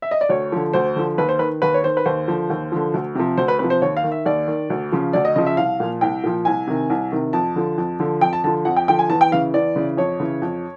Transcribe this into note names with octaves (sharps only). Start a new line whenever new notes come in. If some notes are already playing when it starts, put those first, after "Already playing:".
E5
D#5
D5
D2 C#5
D3 F3
D2 C5
D3 F3
D#2 B4
C5
D#3 B4
D#2 B4
C#5
D#3 C5
B4
D#2 C5
D3 F3
D#2
D3 F3
D2
C3 F3
D2 C5
B4
C3 F3 B4
C5
D#2 C#5
F5
D#3
E5
D#2 D5
D#3
D2
C#3 F3
D2 D5
D#5
C#3 F3 D#5
E5
C2 F5
A#2 F3
C2 G5
A#2 F3
C2 G#5
C3 D#3
C2
C3 D#3
F2 A5
D3 F3
F2
D3 F3
F2 G5
A5
D3 F3 A5
F2 F#5
G5
D3 F3 G5
G#5
E2 A5
G5
C#3 E3 F5
E2 D5
C#3 E3
F2 C#5
C#3 E3
F2